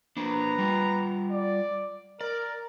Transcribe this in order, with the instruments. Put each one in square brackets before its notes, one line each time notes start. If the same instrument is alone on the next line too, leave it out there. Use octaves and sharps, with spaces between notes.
[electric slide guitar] A#3 D4 [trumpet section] B4 A#5
[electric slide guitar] G3 F4
[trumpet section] D5
[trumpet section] A#4 [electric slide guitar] D5